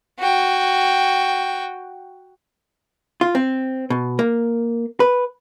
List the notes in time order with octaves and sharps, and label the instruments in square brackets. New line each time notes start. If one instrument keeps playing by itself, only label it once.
[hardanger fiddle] F#4 G5
[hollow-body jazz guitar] F4
C4
B2
A#3
B4